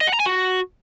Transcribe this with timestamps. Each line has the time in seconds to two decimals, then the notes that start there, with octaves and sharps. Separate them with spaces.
0.01 D#5
0.07 F#5
0.14 A#5
0.20 G#5
0.26 F#4